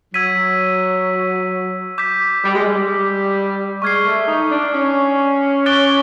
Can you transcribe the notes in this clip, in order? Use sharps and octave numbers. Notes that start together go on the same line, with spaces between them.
F#3 E6 G#6 B6 D#7
D6 G6 B6
G3
G#3
G3
G#3 C#6 F6 G#6 C7
A3
D#4
D4
C#4
D6 F#6 A6 D7 G7